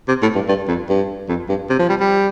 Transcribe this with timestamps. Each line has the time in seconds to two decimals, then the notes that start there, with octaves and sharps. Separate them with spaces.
0.08 C3
0.22 A2
0.35 G2
0.48 G2
0.68 F2
0.89 G2
1.29 F2
1.49 G2
1.70 C3
1.79 F3
1.89 G3
2.00 G3